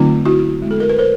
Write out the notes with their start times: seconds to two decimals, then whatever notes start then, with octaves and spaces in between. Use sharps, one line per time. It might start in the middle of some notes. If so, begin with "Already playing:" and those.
Already playing: D3 F#3 A3 C4 D#4 F4
0.25 E4 F#4
0.62 G#3 B3 E4
0.71 A4
0.80 A#4
0.89 B4
0.98 A#4 C5